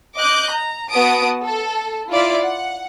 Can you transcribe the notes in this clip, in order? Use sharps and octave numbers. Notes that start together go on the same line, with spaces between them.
D#5 D6 F#6 G6
A#5
B3 F#4 A5 D#6 D7
A4
E4 F4 D5 E5
F#5